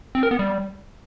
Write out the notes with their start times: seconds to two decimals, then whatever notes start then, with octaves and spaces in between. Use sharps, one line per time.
0.15 C4
0.23 A#4
0.31 B3
0.39 G3